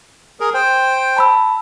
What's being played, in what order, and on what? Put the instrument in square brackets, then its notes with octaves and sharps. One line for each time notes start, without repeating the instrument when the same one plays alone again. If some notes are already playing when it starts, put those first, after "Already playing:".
[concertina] G#4 A#4
C5 G5
[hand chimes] A5 B5 E6